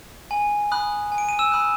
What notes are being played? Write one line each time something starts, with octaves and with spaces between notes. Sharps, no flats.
G#5
B5 D#6 F#6
G#5
D7
D#7
E6 E7
B5 D#6 F#6